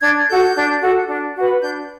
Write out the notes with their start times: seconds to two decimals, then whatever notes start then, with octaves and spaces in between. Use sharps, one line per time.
0.01 D4 G#6
0.28 F#4 A4 G6
0.55 D4
0.81 F#4 A4
1.08 D4
1.35 F#4 B4
1.62 D4 G6